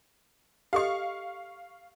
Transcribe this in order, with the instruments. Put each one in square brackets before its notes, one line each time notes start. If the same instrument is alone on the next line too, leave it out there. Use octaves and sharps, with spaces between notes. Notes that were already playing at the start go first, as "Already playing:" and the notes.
[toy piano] G4 A4 D#5 [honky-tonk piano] F5 C#6